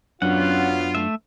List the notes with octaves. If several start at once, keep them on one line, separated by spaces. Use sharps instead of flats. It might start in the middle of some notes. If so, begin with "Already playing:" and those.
F#2 F#3 B3 C#4 D4 F4 F#5
A3 E5